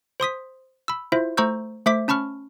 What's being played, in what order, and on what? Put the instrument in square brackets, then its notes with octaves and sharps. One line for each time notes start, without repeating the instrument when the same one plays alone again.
[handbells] C5 C6 D#6 B6
B5 E6
E4 F4 C5 E5
A3 C5 A#5 C#6 E6 G6
A3 C5 E5 D6 B6
C#4 A5 B5 C#6 F6